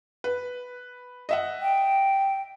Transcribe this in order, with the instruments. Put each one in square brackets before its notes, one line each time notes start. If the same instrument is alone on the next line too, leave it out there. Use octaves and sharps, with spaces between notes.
[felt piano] B4
D#5 E5 F#5
[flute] G5